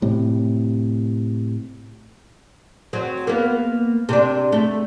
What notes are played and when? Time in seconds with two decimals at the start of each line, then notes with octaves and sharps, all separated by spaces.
0.02 A2 C3
2.93 F#3 C4
3.27 A#3 B3
4.09 C3 D4
4.52 A3